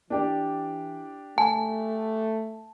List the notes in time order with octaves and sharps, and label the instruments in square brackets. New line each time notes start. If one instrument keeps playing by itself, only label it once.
[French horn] E3 [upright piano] D4 G4 D5
[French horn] A3 [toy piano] G#5 [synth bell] A5